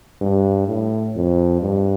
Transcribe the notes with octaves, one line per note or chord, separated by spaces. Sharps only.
G2
A2
F2
G2